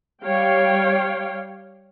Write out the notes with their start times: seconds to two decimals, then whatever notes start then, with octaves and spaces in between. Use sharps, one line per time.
0.23 G3 C#5 F5 G5